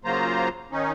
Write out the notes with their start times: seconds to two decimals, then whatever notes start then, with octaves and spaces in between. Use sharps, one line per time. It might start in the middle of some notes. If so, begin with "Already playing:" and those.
0.05 C#3 F#3 A#3 F4 C5 A#5
0.72 D#3 C#4 D#4